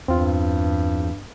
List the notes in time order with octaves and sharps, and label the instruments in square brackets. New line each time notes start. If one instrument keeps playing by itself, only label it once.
[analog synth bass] E2 [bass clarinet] G2 [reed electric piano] C4 F4